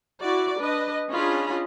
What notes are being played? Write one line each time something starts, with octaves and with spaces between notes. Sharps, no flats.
E4 F#4 D5
D4 B4 D#5
C#4 D4 F4 G#4 D#5 B5